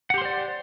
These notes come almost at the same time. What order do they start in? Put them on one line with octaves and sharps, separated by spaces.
F#5 G4 C6 C5 D5